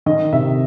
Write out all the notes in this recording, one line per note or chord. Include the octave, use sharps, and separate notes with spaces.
D#3 D#5
C3 E5